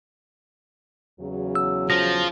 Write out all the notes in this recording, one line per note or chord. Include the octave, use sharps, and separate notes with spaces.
E2 C#3 F#3
E6
F3 A#6